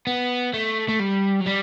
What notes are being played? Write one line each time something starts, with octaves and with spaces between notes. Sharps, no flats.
B3
A3
A3
G3
F#3
G3